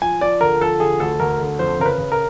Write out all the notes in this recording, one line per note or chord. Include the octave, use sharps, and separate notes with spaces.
F3 G#5
F3 D5
D3 A#4
F3 A4
D3 G#4
D2 A4
D2 A#4
D3
F2 C5
C#3 A#4
B4
C#3
A#4